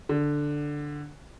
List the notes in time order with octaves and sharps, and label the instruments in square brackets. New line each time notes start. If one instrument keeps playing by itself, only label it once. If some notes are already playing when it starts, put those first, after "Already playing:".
[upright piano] D3